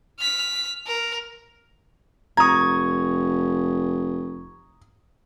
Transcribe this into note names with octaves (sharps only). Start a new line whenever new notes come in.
F6 B6
A#4
F1 A#5 C#6 D#6 G#6